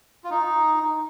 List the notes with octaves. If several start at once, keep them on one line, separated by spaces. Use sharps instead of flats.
F4
D#4